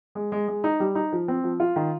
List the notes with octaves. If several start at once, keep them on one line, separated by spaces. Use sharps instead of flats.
G#3
G#3
G#3
D#4
G3
D#4
F3
C4
F3
F4
D#3